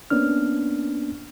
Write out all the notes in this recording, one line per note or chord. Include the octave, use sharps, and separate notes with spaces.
A#3 B3 C#4 D4 F6